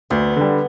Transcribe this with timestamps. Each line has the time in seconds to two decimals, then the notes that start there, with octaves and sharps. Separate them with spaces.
0.10 D2 B3
0.37 D3 G3